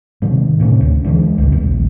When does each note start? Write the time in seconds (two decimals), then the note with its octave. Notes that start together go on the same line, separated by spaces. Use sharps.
0.22 G#2 C3 D#3
0.60 A2 C3 B3 C#4
0.80 D2
1.04 D3 E3 G3 G#3
1.38 G#1 C#2
1.52 A#1 D#2